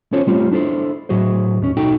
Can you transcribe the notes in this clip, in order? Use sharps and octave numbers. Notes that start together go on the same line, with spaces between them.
C#4 F4 A4 C5 C#5
G3 A3 C4 C#4 F4 G4
D4 E4 A4 C5
A2 F#3 F#4 G#4 C5
D#2 C#4
B1 D#4 F#4 A4 G5